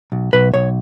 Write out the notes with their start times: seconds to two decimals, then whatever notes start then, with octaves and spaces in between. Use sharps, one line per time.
0.12 B1
0.33 B1 B4
0.54 B1 C#5